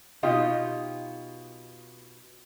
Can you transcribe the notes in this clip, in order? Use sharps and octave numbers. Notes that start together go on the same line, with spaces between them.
B2 D#4 F4 G4 D#5